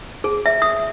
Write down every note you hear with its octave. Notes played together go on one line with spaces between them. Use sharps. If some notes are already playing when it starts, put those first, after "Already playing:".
G#4
E5
D#6